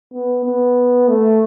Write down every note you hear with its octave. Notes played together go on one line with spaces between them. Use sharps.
B3
B3
A3